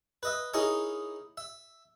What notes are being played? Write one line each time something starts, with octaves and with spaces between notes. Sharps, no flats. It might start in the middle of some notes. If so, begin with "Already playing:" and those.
B4 D#5 E5
D#4 E4 G#4 A#4 C#5 D#5
E5